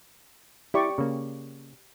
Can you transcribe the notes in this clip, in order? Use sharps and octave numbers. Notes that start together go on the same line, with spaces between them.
E4 G4 D5 C#6
C#3 A#3